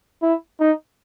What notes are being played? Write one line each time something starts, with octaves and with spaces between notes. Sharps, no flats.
E4
D#4